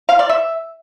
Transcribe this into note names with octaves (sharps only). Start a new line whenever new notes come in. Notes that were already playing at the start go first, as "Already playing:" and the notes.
F5
D5
E5